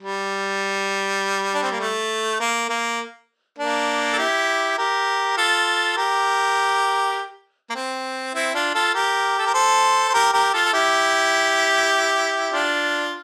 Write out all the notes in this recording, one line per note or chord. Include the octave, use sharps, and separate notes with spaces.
G3
D4
C4
A#3
A3
A#3
A#3
A#3 D4
A4
E4 G4
G4 A#4
F4 A4
G4 A#4
A#3
C4
C4 E4
D4 F4
F4 A4
G4 A#4
A4
A#4
A4 C5
C5
G4 A#4
G4 A#4
F4 A4
A4
E4 G4
D4 F4